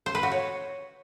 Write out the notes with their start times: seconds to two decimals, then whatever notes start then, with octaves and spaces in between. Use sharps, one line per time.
0.06 C5
0.15 B4
0.23 F#4
0.31 C#5